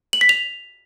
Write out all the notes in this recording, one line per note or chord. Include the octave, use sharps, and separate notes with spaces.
F#7
B6
F7